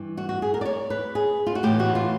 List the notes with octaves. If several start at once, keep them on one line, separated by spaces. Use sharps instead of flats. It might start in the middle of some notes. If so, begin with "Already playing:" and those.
Already playing: G2 E3
F#4
F#4
G#4
A#4
D5
C#5
B4
G#4
F4
F#4
A2 E3 G4
F#4
F4